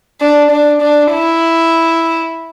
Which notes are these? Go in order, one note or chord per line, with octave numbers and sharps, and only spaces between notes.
D4
D4
D4
E4